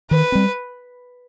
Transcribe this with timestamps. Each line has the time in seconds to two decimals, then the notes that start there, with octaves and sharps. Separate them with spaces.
0.11 D#3 B4
0.32 G3 C4